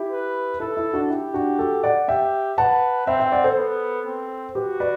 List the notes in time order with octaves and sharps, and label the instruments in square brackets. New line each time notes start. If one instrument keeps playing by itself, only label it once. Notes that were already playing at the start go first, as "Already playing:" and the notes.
Already playing: [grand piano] E4 G4
[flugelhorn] B4
[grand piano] E4 [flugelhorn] A4
[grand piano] E4
D4 F#4
[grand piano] E4 [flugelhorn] G4
[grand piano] D4 F#4
F#4 A4
D5 F#5
[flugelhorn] G4 [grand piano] E5 G5
[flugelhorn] B4 [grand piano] F#5 A5
[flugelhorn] C4 [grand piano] E5 G5
[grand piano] E5 G5
D5 F#5
A4 C5
[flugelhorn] B3
C4
[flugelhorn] F#4 [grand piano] G4 B4
[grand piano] B4 D5